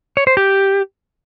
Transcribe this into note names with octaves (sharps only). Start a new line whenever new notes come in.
C#5
C5
G4